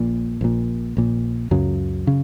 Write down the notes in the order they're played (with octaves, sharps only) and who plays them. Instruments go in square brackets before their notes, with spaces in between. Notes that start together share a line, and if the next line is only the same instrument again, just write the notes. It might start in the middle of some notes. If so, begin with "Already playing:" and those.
Already playing: [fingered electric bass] A#1 A#2
A#1 A#2
A#1 A#2
C#2 F#2 C#3 F#3
C#3